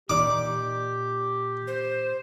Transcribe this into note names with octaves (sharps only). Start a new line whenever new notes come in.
A#2 D#4 G4 D5 D6
C5